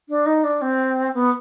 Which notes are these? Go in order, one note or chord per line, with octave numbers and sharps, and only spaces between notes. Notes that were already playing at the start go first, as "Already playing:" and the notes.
D4
D#4
D4
C4
B3